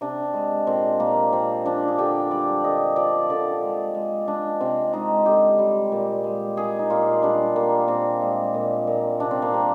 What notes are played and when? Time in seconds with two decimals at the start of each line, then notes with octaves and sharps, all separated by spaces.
0.01 C3 D4
0.34 G#3
0.67 A#2 C4
0.99 A#2 A#3
1.32 F3 C4
1.65 F3 D4
1.88 G#4
1.98 D3 G4
2.31 G3 D5
2.64 D3 D#5
2.96 F3 D5
3.30 D3 D5
3.62 G#3
3.95 G#3
4.27 G#3 D4
4.60 C3 C4
4.93 G#3 D#4
5.26 D3 G4
5.59 G3
5.92 A#2
6.24 G#3
6.57 A#2 G#4
6.79 D#4
6.90 A#2 F4
7.22 G3 D4
7.56 G3 A#3
7.88 A#2 C4
8.21 G#3
8.54 A#2
8.87 A#2
9.20 C3 D4
9.31 C4
9.42 A#3
9.52 G3 C4